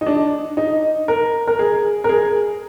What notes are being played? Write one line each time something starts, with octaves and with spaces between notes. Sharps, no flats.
D#4
D4
D#4
A#4
A#4
G#4
A#4
G#4